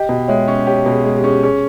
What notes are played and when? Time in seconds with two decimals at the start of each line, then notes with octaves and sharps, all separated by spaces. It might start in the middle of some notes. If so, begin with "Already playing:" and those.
Already playing: G4 D#5 G5
0.09 B2
0.28 G#3 C#5 E5
0.48 C#4
0.67 G4 C#5
0.86 B2
0.92 G#4
1.04 G#3
1.17 G4
1.24 C#4 G#4
1.32 G4
1.43 C#4 G#4